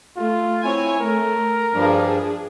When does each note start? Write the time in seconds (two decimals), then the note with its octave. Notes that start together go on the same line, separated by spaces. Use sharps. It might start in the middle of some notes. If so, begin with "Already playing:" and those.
0.17 A3 F4
0.64 C4 E4 C#5 G#5
1.00 A3 A#4
1.74 G2 F3 G3 D4 G#4